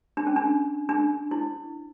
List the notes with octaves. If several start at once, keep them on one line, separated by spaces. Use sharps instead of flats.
D4
C#4
D4
D4
E4